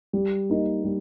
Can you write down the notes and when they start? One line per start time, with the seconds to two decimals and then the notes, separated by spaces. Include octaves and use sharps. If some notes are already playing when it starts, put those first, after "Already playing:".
0.13 G3
0.50 A#3 D#4
0.84 G3